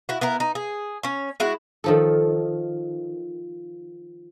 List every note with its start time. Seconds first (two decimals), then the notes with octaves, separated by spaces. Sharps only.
0.09 E4 F#4
0.21 B3 E4 A#4
0.40 D#4
0.55 G#4
1.03 C#4 C#5
1.40 G#3 E4 F#4
1.84 D#3 F3 A4